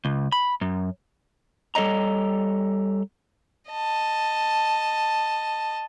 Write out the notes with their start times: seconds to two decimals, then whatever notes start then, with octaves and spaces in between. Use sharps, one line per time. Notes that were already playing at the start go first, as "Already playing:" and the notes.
0.05 C#2
0.32 B5
0.61 F#2
1.75 G3 A4 C#5 D#5 A#5
3.71 D#5 A5